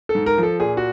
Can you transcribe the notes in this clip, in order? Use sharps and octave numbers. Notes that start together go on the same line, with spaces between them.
A4
G#2
A#4
F3 A4
A#2 G#4
F#4